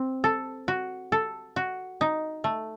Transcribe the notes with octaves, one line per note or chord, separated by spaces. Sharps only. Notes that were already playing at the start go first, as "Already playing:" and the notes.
Already playing: C4
A4
F#4
A4
F#4
D#4
A3